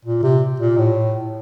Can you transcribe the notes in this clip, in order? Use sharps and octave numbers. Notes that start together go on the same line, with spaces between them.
A#2
C3
A#2
A2